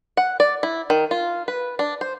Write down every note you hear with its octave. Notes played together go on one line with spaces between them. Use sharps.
F#5
D5
E4
D#3
F4
B4
D4
C5